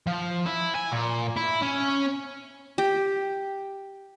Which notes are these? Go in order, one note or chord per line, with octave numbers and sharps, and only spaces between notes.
F3
E4
G#5
A#2
E4
C#4
G4